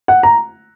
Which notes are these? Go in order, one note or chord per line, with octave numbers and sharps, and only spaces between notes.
F#5
A#5